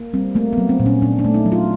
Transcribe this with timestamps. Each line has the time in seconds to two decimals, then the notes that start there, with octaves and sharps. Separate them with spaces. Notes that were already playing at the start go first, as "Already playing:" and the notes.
Already playing: A#3
0.14 G3 C4
0.35 A3 A#3
0.53 F#3 B3
0.69 C4
0.80 A#2
0.86 C#4
1.02 A#2 D4
1.19 D4
1.25 A3
1.34 D#4
1.46 F#3
1.52 F4